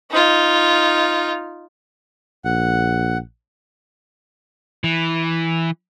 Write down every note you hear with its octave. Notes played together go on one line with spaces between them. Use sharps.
D#4 F4
A#1 F#5
E3